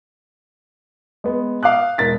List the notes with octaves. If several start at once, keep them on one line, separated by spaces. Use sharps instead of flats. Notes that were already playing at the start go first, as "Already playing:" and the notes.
G#3 B3
F5 D6 D#6 F#6
E1 A#4 A6 B6